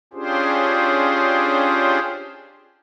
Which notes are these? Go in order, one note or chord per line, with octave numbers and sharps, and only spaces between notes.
C#4 D4 F4 G4 G#4 C5